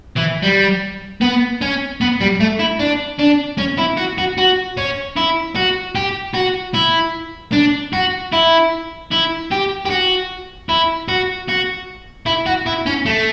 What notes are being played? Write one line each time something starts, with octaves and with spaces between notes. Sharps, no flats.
E3
G3
B3
C#4
B3
G3
A3
E4
D4
D4
C#4
E4
F#4
F#4
F#4
C#4
E4
F#4
G4
F#4
E4
D4
F#4
E4
E4
G4
G4
F#4
E4
F#4
F#4
E4
F#4
E4
C#4
A3